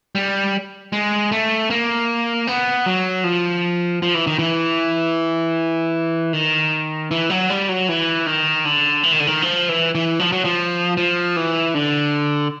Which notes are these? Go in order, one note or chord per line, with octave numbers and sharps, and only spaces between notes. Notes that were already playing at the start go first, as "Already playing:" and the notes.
G3
G#3
A3
A#3
B3
F#3
F3
F3
E3
D#3
E3
D#3
E3
F#3
G3
F#3
E3
D#3
D3
E3
D#3
D3
D#3
F3
E3
E3
F3
F#3
F3
F3
E3
D3